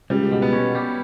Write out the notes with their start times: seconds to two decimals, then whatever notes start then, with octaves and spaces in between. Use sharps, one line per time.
0.10 C#2 G3
0.32 B2
0.42 B3
0.53 C#4
0.75 G3